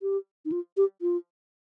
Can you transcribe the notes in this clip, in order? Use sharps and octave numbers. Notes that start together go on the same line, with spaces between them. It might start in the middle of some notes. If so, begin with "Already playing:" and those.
G4
D#4
F4
G4
F4